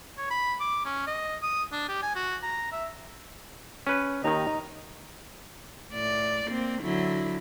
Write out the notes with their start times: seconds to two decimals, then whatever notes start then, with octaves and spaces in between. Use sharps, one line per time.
0.18 C#5
0.30 B5
0.60 D6
0.85 C#4
1.07 D#5
1.42 D#6
1.72 D4
1.89 G4
2.02 G#5
2.16 F#4
2.43 A#5
2.72 E5
3.87 C#4 B4
4.24 D#2 D#3 D#4
5.92 A2 D5
6.49 A#3 C4
6.82 D3 F#3 E4